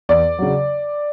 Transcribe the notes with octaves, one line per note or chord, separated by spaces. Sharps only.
E2 D5
C#3 F#3